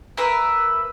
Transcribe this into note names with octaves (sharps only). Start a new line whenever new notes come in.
A#4 B4 E5